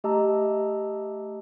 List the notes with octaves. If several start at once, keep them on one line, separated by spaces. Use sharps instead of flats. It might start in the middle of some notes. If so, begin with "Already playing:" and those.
A3 G4 D#5 A5 A#5 E6